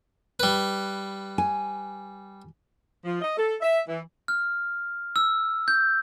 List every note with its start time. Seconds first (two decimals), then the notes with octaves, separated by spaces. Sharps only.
0.40 G3 B4
1.38 G#5
3.04 F3
3.21 D#5
3.38 A4
3.61 E5
3.87 E3
4.28 F6
5.16 E6
5.68 G6